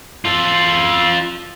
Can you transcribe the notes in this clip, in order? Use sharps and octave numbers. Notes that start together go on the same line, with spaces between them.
F4 A4